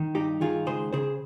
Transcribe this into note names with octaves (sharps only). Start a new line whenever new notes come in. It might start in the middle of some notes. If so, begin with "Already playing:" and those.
Already playing: D#3
G2 D#4 G4
D#3 F4 G#4
C#2 G#4 C5
C#3 G#4 C5